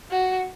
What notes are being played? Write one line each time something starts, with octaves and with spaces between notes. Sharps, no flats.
F#4